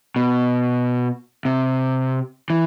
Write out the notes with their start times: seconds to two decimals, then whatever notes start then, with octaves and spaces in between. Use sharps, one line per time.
0.16 B2
1.45 C3
2.50 E3